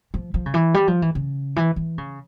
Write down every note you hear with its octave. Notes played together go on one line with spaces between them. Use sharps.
F3
F3
C#3
E3
G3
F3
E3
C#3
E3
E3
C#3